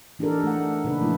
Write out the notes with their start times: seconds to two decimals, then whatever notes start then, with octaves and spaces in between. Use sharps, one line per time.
0.19 E3 D4 D#4 G4 A4 A#4
0.43 A3 F#5
0.85 A#2 C#3 D4 D#4 B4
1.01 F3 A3 E4